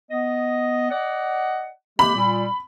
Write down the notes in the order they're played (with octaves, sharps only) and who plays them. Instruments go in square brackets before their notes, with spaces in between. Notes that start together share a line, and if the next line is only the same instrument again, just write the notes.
[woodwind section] B3 D#5
D5 D#5 F#5
[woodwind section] G#3 A#3 G4 [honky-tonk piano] B5
[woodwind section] A#2 G3